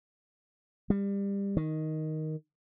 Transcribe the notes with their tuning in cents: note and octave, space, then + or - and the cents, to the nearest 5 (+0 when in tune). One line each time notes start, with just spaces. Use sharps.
G3 +25
D#3 +5